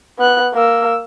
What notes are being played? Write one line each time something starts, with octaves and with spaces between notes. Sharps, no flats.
B3 F#6
A#3 E6